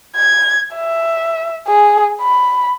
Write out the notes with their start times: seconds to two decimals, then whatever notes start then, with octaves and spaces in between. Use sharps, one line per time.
0.16 G#6
0.75 E5
1.68 G#4
2.21 B5